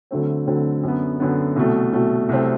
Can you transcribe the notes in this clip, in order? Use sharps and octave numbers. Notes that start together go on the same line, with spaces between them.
D2 D3 F#3 A3 C4
D2 D3 F#3 A3 C4
F#2 D3 F#3 B3
F#2 D3 F#3 B3
C2 B2 F#3 A3
C2 B2 F#3 A3
C2 C3 F#3 A3 C4